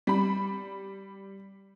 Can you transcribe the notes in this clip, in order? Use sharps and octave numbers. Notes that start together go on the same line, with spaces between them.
G3 B5